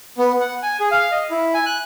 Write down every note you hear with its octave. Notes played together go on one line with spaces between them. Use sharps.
B3
F#5
G#5
G#4
F5
D#5
E4
G#5
F#6